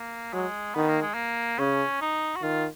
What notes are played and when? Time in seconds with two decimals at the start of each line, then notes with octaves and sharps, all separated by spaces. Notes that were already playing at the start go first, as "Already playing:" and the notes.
Already playing: A#3
0.33 F#3 G#3
0.75 D#3 B3
0.89 A#3
1.01 G#3
1.14 A#3
1.58 C#3 C#4
2.01 D#4
2.36 F#4
2.42 D#3 F4